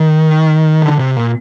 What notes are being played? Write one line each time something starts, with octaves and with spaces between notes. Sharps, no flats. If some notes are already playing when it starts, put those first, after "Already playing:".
Already playing: D#3
D3
C3
A#2